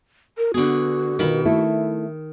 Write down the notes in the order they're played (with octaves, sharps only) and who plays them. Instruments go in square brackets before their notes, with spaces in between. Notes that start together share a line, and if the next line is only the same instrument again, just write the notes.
[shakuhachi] A#4
[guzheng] D3 G#4 [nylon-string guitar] B3 [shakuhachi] F#4
[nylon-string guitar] B2 F4 A#4 [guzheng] D#3 B5
[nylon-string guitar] A3 E4 A4